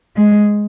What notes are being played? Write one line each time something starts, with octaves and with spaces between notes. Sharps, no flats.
G#3